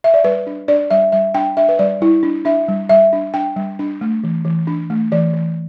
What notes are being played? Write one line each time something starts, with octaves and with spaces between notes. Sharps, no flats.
E5
D5
G3 B4
D4
D4 D5
G3 E5
G3 E5
D4 G5
D4 E5
B4
G3 D5
G3 E4
D4
D4 E5
G3
G3 E5
D4
D4 G5
G3
D4
A3
E3
E3
D4
A3
E3 D5
E3